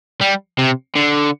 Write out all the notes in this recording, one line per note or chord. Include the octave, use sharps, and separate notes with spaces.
G3
C3
D3